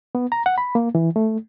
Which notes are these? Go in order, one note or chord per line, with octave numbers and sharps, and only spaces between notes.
B3
A#5
F#5
B5
A#3
E3
A3